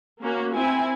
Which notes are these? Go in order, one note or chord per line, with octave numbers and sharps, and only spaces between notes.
A#3 C#4 F#4
C4 E4 G#5